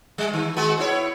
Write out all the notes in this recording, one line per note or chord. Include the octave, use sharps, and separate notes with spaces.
G3
D#3
G#3 B3 F#4
B3 E4 C#5